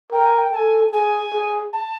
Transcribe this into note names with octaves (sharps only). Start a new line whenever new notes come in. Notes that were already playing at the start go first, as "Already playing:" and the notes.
A#4 G5
G#5
G5
A4 G#5 A5
G#4 G#5
G#4
A5